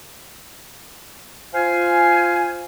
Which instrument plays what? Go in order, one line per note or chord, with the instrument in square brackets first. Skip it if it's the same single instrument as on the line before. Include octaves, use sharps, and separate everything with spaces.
[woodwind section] F4 C5 F5 G#5